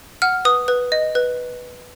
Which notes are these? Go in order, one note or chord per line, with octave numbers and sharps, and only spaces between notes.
F#5 F6
B4 D#6
B4
D#5
B4